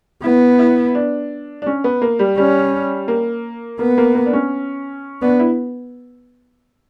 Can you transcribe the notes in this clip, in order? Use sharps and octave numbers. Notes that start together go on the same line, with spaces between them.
B3 E4
E4
D4
D4
C#4
B3
A#3
G3
G3 C#4
A#3
A#3 B3
A#3
A#3
D4
C#4
B3 D4
E4